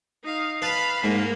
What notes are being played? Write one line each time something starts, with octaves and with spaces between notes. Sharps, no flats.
D#4 F5
B4 F5 A5 B5
G#2 A#3